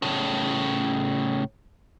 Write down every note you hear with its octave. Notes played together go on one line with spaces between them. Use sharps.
A2 C#3